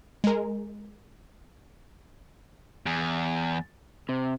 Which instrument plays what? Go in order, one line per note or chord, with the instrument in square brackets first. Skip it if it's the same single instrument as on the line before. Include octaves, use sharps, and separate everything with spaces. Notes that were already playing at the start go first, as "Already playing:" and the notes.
[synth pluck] G#3 A#4
[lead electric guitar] E2
[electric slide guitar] C3